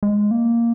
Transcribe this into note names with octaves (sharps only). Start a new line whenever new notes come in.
G#3
A#3